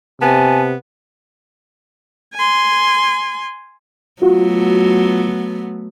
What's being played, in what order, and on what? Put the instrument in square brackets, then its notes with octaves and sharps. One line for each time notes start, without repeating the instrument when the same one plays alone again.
[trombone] C3 [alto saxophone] B3 [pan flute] G#5 [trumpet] A5
[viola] G#5 C6
[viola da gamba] F#3 A3 B3 [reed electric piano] F4 F#4